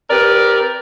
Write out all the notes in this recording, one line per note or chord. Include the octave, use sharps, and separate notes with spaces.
C4 G4 A#4 B4 D5